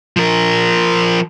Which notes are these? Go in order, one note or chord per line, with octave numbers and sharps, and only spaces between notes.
F3 A#4